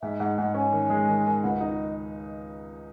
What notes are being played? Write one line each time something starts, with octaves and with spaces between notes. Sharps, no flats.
G#2 E5
G#2 F#5
G#2 F#5
C#4 G#5
D#3
G#3
D#3
D#3
C#2 F#5
D#4
D#5